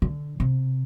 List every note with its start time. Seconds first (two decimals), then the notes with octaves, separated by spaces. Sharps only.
0.02 D3
0.40 C3